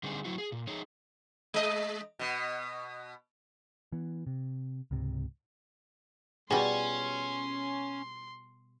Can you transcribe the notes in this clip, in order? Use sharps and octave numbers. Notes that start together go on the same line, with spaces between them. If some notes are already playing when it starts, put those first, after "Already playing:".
D3 G3 C4 D#4 G#4
F#3 E4 F#4
G#4
A#2
D#4 G#4 C#5
G#3 D#5
B2 B3
E3 B3
C3
C#2 G#2 C3
B2 G3 C#4 F4 F#4 G#4 C6